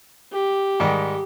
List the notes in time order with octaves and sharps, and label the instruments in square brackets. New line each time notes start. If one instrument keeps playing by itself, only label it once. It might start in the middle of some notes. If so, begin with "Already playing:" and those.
[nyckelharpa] G4
[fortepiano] G#2 D#3 G3